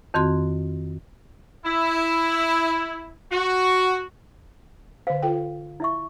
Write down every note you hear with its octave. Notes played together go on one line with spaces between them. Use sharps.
F2 D#3 C4 F#4 C6
E4
F#4
D3 C5 F5
F4 A4 G5
E4 E5 C#6